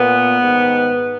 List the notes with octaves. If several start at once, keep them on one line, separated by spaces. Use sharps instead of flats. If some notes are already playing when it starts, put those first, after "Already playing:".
Already playing: A#2 B3
G#2 D#3